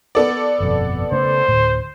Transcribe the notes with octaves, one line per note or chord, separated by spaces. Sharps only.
B3 A4 D5
G1 F2 B2
C#3 A3 C5
D2 A2